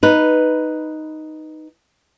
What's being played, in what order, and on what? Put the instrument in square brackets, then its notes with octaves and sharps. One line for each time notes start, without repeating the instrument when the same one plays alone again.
[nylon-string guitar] D#4 B4